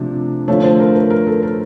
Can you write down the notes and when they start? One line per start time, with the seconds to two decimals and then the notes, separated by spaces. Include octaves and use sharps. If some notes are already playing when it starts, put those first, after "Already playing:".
Already playing: C3 F3 A3 D4
0.48 D3 F3 A3 C#5
0.63 C5
0.80 A#4
0.95 B4
1.10 A#4
1.27 A4
1.43 A#4